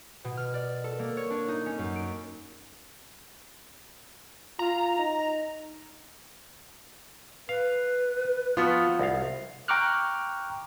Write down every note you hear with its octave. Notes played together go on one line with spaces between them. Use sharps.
B2
F6
D5
A4
A#3
C#5
D4
D#4
C#4
F#2
D7
F4 A#5
D#4
B4 F5
F3 B3 F4 F#4
C2 F5
G5 A#5 C#6 D6 F6 F#6